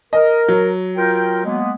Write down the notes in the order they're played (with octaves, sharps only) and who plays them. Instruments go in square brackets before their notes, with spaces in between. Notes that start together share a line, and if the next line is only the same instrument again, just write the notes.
[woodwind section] A#4 [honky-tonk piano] D#5
[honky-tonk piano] F#3
[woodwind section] F4 A#4 G5
G#3 A#3 B3